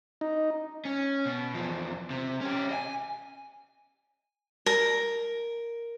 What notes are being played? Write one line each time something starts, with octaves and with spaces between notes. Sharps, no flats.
D#4
C#4
B2
E2 F3
C3
C#4 G4
D#5 G#5
A#4